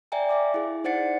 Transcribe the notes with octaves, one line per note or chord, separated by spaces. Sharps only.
D5 E5 G5 G#5 A#5
E5 F5 D6
E4 G#4
D#4 C5 D5 F#5 A6 C#7